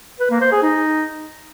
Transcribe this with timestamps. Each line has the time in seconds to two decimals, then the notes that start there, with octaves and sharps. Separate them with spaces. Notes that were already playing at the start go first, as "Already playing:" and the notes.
0.20 B4
0.30 A#3
0.41 C5
0.52 G#4
0.62 D#4